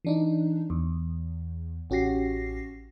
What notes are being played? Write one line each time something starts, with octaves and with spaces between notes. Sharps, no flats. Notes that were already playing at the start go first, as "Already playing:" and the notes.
E3 D4 D#4
E2
A1 C#4 F#4 G4 A#6 C7